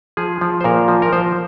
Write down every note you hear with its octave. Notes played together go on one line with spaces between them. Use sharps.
F3 G#4
F3
C5
A#2 A#4
F3
A#4
F3 C5